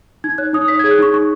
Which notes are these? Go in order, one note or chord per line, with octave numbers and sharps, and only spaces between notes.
D#4 G#6
C#5 F#6
D#4 D#6
C#5 B6
G#4 G#6
F#6
D#4 C#6
D#4 C#6